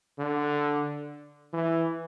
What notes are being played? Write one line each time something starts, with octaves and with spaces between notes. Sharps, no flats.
D3
E3